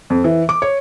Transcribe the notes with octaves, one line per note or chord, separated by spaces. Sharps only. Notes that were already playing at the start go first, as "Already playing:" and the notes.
F2
E3
D6
C#5